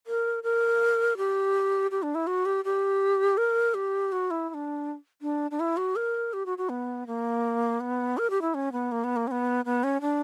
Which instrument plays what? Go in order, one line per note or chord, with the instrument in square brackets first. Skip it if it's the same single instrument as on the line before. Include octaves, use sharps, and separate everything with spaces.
[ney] A#4
A#4
G4
G4
D4
E4
F#4
G4
G4
A#4
G4
F#4
E4
E4
D4
D4
D4
E4
F#4
A#4
G4
F#4
F#4
B3
A#3
B3
A#4
G4
E4
C#4
B3
A#3
B3
A#3
C#4
B3
B3
C#4
D4